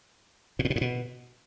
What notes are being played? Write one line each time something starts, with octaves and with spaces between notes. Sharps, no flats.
A#2
A2
B2
G#2
B2